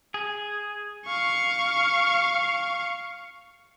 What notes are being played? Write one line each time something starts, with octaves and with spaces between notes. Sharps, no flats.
G#4
F5 C#6